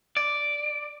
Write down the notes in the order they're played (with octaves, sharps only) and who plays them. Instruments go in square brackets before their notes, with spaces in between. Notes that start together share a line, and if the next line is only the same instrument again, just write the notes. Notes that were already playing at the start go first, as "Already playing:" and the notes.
[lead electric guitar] D5